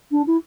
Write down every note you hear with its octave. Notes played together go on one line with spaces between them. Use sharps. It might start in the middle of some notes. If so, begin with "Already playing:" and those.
D4
E4